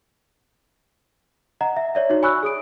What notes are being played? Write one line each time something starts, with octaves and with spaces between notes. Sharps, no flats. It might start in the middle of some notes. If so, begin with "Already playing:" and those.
D#5 F#5 A#5
E5
C#5 D5 E5
D#4 F#4 C#5
G#5 B5 C#6 E6 F#6
G#4 D#6 D7